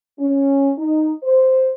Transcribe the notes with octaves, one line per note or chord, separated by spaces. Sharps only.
C#4
D#4
C5